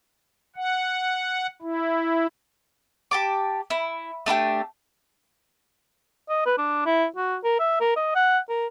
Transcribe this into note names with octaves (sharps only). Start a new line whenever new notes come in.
F#5
E4
G4 A5 D6
E4
A3 D4 E4 G4
D#5
B4
D4
E4
F#4
A#4
E5
A#4
D#5
F#5
A#4